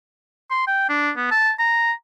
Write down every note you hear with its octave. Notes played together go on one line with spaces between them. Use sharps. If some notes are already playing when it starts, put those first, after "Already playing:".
C6
G5
D4
B3
A5
A#5